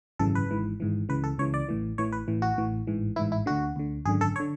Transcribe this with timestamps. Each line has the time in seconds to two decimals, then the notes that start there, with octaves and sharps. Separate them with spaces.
0.19 G#1 F#2 C#3 E3 A4
0.35 B4
0.49 G#1 G#2 E3
0.80 G#1 G#2 E3
1.09 C#2 C#3 E3 B4
1.24 A4
1.38 C#2 C#3 E3 C#5
1.54 D5
1.69 A1 A2 E3
1.98 A1 A2 E3 C#5
2.12 B4
2.28 A1 A2 E3
2.42 F#4
2.58 A1 A2 E3
2.87 A1 G#2 E3
3.16 E3 E4
3.19 A1 G#2
3.32 E4
3.46 D2 D3 F#4
3.76 D2 D3
4.05 G#1 F#2 D3 G#4
4.21 A4
4.36 C#5
4.39 D3